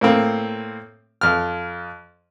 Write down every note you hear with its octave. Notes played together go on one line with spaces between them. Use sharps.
A2 A#3 C4
F2 F6